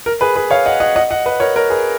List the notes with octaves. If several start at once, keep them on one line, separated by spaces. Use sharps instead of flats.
A#4
G#4 B4
G#4 B4
C#5 F5
D#5 F#5
D#5 F#5
D#5 F#5
D#5 F#5
B4 D#5
A#4 C#5
A#4 C#5
G#4 B4